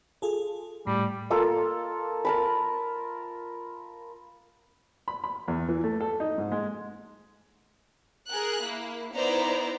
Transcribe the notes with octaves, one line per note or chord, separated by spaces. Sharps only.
F4 G#4 A4
A2 G3
A#3 F4 A4
A#4 A5 B5
B5
B5
E2
E3
A3
A4
D#4
G#2
G#3
G#4 A#4 F#6
A#3 E4
B3 D#4 E4 C5 D5 A#5